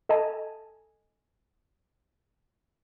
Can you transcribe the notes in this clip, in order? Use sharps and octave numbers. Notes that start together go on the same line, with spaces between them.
A4 D#5 G#5 A5